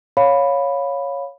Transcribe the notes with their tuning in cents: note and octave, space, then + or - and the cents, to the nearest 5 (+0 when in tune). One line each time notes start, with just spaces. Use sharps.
C#5 +0 F5 +15 B5 +0